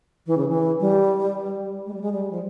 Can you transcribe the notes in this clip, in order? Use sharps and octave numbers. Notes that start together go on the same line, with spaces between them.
E3
C#3
E3
G3
G#3
G3
G#3
G3
F3